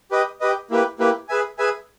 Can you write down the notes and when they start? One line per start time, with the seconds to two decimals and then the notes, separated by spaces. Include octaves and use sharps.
0.11 G4 B4 D#5
0.41 G4 B4 D#5
0.70 A#3 E4 G4 B4
0.99 A#3 E4 G4 B4
1.29 G#4 B4 E5 G#5
1.58 G#4 B4 E5 G#5